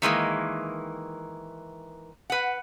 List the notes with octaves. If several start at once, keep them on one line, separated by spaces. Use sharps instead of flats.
D#3 E3 G#3 A#3
B4 F#5